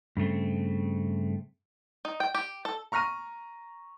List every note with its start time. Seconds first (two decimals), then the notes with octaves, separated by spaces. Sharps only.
0.17 G2 C#3 A3 C4
2.05 D#4
2.20 G5
2.34 G4
2.65 A4
2.92 A#5 C#6 F6 A#6 D#7